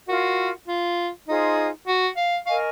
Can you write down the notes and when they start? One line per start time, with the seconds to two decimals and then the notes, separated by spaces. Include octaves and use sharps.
0.08 F4 F#4 A#4 D#5
0.68 F4
1.28 D#4 F4 G#4 C5
1.87 F#4
2.16 F5
2.46 A#4 D#5 F5 G#5 C#6